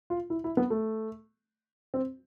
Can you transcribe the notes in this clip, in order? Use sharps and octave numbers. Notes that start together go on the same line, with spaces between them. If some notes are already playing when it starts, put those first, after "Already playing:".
F4
E4
E4
B3
A3
C4